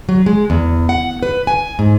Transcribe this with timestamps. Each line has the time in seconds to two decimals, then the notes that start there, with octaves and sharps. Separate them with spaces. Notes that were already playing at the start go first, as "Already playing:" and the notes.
0.09 F#3
0.26 G#3
0.50 E2
0.89 F#5
1.23 B4
1.47 G#5
1.79 G#2